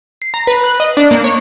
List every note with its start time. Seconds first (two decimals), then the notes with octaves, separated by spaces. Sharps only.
0.22 C7
0.34 A#5
0.47 B4
0.64 F#6
0.80 D#5
0.97 D4
1.11 A#3
1.24 C#5